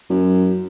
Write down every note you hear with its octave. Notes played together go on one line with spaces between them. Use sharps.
F#2